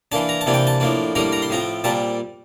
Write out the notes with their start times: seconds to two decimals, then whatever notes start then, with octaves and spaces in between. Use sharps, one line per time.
0.12 E3 A#3 D4 A5
0.29 A#5
0.41 A5
0.46 C3 E3 A#3 D4
0.53 G5
0.67 A5
0.80 A2 F3 A#3 D4
1.15 A2 G3 A#3 D4 A#5
1.32 A#5
1.42 C6
1.49 A2 F3 C4 A#5
1.84 A#2 G3 C4 A5